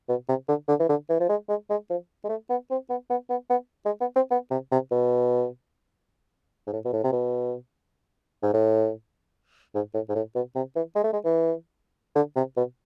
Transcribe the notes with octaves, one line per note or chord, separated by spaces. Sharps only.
B2
C3
D3
D3
E3
D3
E3
F3
G#3
G#3
G#3
F3
G#3
A3
B3
C4
B3
B3
B3
B3
G#3
B3
C4
B3
C3
C3
B2
G#2
A2
B2
A2
C3
B2
G#2
A2
G#2
A2
G#2
A2
B2
C3
E3
G#3
A3
G#3
E3
D3
C3
B2